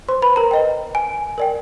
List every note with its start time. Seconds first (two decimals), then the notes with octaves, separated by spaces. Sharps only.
0.09 C5 C6
0.22 B4 B5
0.36 A#4 A#5
0.51 B4 D#5 G5
0.95 G#5
1.38 A#4 D5 G5